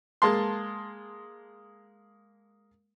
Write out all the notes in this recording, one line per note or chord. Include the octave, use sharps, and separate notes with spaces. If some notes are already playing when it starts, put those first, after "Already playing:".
G#3 A#3 A5 C6